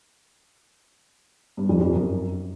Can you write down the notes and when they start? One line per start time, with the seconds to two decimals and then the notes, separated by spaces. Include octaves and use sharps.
1.57 G2
1.69 F2
1.81 F2
1.93 F#2